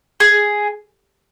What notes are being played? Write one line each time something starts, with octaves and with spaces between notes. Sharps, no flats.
G#4